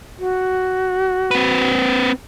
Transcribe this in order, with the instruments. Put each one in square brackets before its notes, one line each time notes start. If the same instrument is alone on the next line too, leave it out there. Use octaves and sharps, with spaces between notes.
[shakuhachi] F#4
[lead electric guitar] C4 B4